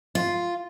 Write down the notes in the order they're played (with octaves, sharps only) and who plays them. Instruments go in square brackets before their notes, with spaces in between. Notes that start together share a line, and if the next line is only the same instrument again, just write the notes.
[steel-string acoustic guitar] F4